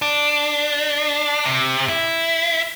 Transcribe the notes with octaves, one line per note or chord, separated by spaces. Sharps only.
D4
C3
E4